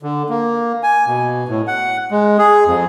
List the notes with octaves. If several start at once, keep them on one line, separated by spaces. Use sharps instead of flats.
D3
A#3
G#5
B2
A2
F#5
G#3
G#4
F2